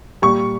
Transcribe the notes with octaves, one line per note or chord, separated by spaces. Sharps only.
A#2 G3 C#6